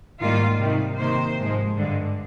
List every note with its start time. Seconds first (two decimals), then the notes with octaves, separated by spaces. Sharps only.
0.20 G#2 D#3 G3 A#3 F4
0.59 C3 D#3 G3
0.99 C3 D#3 A#3 C5
1.38 G#2 F3 G#3
1.78 G2 D3 G#3